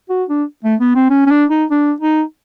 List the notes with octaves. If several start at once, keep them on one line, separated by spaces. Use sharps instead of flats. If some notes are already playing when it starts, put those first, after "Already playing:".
F#4
D4
A3
B3
C4
C#4
C#4
D4
D#4
D4
D#4